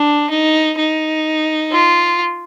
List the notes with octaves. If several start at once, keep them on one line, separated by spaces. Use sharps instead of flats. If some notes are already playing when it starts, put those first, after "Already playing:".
Already playing: D4
D#4
D#4
F4